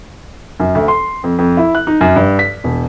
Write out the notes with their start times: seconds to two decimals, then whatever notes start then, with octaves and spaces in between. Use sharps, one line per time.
0.60 F#2
0.75 D2
0.88 C6
1.24 F2
1.38 F2
1.57 E4
1.75 F#6
1.87 D#4
2.01 F#2
2.16 G2
2.39 B6
2.64 E1